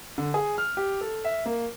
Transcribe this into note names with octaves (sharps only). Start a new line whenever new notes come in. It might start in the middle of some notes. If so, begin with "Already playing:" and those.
D3
G#4
F6
G4
A4
E5
A#3